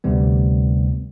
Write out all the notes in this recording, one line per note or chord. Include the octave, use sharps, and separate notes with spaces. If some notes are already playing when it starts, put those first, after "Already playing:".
D2 C3 G3 B3